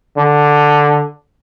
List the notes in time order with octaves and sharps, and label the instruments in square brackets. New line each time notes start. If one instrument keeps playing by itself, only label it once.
[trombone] D3